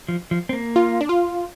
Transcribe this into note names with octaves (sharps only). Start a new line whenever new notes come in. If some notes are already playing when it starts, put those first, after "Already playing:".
F3
F3
C4
A#3
F4
D4
F4